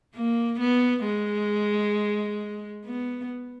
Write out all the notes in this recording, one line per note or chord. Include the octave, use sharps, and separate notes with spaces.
A#3
B3
G#3
B3